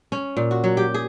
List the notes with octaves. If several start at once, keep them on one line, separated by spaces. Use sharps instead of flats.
C#4
A#2
F#4
F#3
G4
G#4